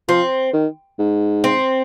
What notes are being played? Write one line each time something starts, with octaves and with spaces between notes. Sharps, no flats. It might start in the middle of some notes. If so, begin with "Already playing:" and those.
F3 C4
D#3
G#2
C4